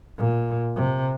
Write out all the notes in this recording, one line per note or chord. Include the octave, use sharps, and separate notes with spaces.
A#2
C3